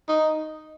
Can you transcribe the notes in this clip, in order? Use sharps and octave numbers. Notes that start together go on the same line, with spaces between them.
D#4